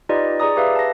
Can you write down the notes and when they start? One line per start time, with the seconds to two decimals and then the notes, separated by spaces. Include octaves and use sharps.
0.09 D#4 F4 G4 B4 D5 D#5
0.40 G#4 D5 A#5 D#6
0.56 G4 B4 E5 F5
0.75 A5 A#6